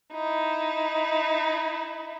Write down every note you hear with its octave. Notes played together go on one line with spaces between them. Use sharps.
D#4 E4